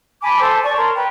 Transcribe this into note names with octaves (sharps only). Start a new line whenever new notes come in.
G#5 A5 B5 D6
A4 C5 A5 C6
D5 A5 C#6
A#4 C#5 C6
B4 G5